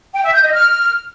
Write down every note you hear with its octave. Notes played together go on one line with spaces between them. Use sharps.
G5
E5
G6
D#5
F6